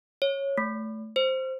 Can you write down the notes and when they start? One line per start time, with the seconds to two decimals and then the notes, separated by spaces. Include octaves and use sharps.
0.22 C#5
0.58 A3
1.16 C5